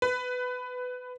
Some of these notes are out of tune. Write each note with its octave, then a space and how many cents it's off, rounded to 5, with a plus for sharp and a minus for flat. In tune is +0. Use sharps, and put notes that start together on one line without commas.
B4 +15